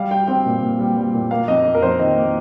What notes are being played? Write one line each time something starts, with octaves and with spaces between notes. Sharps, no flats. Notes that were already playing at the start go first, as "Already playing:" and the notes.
Already playing: G3 F5
G3 G5
C4 G5
A#2
A#2
G3
G3
A#2
A#3 F5
F2 D#5
F2
A#4
F2 C5
D#3 D#5
A#3